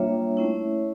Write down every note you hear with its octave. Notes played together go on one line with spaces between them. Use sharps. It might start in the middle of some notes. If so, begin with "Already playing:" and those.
Already playing: G3 A#3 D4 F4 C#5 E5
A3 C#4 E4